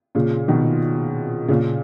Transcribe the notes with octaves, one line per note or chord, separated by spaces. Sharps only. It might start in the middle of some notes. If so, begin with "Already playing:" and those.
A#2 C#3
B2 D#3
A#2 C#3